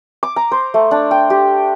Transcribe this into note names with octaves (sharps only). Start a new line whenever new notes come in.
D6
A#5
C5
A3
D4
G5
G4